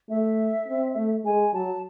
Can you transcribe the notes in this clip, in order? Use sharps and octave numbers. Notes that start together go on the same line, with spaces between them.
A3 E5
C4
A3
G#3 G#5
F#3 A5